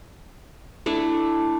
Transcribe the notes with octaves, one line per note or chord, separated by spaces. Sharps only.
A3 D4 E4